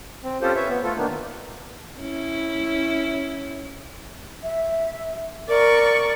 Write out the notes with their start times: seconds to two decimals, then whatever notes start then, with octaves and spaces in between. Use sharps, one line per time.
0.23 C4
0.42 C4 C#4 F4 G4 A4 C5
0.56 B4 C#5 E5
0.69 B3
0.84 A3 F4 A4
0.97 D#3 A#3 B3 D4 D#4
1.99 C#4 E4
4.43 E5
5.48 A#4 D5 C#6